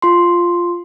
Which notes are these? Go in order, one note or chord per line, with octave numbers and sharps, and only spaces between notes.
F4 C6